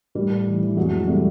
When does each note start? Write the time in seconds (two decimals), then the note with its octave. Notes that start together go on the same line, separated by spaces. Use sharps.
0.15 A2 G3
0.31 A2
0.47 E3
0.62 E3
0.77 F2 F#3 G#3
0.93 E3
1.08 C3 G3 A3